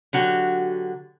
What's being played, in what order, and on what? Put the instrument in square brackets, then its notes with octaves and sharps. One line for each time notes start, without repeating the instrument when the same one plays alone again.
[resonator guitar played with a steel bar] D3 F#3 F#4 G4